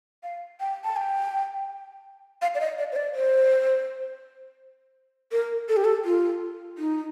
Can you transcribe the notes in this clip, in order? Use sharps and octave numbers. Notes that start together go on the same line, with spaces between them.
F5
G5
A5
G5
F5
D5
D#5
D5
C5
D5
C5
A#4
A4
G4
A4
F4
D#4